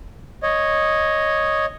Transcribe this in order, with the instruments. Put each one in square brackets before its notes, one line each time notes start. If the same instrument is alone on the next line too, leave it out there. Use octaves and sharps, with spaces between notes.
[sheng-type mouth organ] C#5 D#5